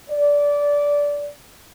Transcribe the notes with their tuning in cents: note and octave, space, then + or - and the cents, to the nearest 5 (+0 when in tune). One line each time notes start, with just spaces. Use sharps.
D5 -15